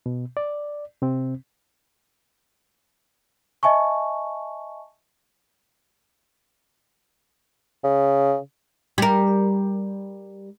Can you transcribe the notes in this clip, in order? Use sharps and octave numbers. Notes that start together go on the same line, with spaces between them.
B2
D5
C3 C4
D#5 E5 G#5 A5 C#6
C#3
G3 A#4